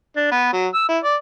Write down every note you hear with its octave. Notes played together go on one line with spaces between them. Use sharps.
D4
B3
F#3
E6
E4
D5